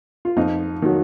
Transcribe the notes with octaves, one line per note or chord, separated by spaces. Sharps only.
F4
F2 D#4
D#3 F#3